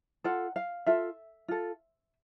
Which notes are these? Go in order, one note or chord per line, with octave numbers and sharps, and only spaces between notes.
F4 A4 F#5
F5
F4 A4 E5
F4 A4